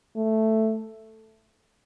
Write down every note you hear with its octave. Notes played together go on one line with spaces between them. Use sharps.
A3